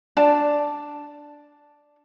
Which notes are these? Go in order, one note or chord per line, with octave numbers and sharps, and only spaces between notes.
D4 A5